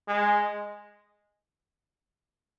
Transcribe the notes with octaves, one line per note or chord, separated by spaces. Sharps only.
G#3